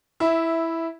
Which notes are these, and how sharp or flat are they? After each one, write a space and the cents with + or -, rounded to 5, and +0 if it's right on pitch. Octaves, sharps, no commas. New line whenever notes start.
E4 +0 E5 -10